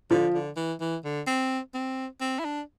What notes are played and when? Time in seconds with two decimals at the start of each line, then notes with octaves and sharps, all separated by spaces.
0.10 D3 F3
0.34 D3
0.56 E3
0.80 E3
1.04 D3
1.27 C4
1.74 C4
2.20 C4
2.39 E4
2.45 D4